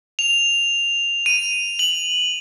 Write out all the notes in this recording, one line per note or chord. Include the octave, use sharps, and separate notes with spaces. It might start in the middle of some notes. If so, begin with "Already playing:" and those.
F7
D#7
F#7